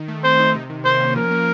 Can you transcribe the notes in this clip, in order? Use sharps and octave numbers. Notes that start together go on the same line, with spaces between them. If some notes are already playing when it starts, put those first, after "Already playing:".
Already playing: D#3
A3
C4 C5
D#4
C3
D#3
A#3 C5
C#4
F3 A#4
A#3